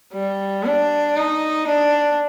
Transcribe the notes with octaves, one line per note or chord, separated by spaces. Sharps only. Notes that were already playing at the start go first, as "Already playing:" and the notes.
G3
D4
D#4
D4